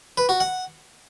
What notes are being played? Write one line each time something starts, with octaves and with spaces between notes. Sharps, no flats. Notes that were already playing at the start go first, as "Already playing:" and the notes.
B4
F#4
F#5